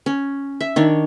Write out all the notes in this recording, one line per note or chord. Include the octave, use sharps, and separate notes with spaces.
C#4
E5
D#3 D4 C#5